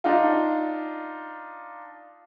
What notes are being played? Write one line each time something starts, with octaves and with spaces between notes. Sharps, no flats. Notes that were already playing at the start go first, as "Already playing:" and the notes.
D4 D#4 F4